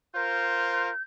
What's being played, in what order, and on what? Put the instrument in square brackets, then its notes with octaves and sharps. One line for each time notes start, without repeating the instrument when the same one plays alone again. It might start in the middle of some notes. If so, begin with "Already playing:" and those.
[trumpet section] F4 A#4 C5 [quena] G6